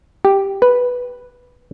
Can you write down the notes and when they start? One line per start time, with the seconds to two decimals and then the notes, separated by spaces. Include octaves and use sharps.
0.25 G4
0.62 B4